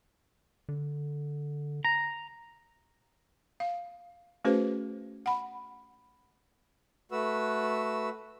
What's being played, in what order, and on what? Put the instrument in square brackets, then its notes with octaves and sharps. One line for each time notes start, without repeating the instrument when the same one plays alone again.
[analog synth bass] D3
[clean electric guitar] A#5
[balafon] F5
A3 C#4 F#4 G#4 B4 C5
F#5 B5
[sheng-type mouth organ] A3 F#4 B4 E6